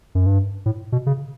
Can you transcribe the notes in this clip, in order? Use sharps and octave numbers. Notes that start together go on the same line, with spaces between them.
F#2
G2
A2
B2
C#3